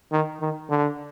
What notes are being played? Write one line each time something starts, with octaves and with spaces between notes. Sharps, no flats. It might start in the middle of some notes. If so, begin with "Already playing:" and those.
D#3
D#3
D3